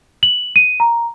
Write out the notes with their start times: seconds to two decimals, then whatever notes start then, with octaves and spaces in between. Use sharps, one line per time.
0.23 F#7
0.56 D#7
0.80 A#5